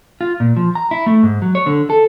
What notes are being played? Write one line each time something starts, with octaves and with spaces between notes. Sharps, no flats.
F4
A#2
F3
A#5
E4
A3
G#2
F#3
C#5
D3
A4